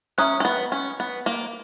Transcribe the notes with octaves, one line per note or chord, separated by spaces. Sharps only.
C#4 E5 A#5 D#6 F#6
C#4
B3
C#4
B3
A#3